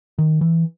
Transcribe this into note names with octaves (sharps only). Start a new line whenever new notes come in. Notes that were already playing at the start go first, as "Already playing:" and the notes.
D#3
E3